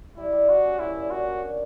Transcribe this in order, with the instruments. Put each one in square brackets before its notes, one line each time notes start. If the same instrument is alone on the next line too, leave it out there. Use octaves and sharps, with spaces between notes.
[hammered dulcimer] G3 [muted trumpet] E4
[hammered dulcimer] G3
[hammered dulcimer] G3 [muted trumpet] F#4
[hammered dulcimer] C#4
[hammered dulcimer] A#2 [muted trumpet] E4
[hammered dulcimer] A#2
[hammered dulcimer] A#2 [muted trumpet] F#4
[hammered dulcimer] A#3
D4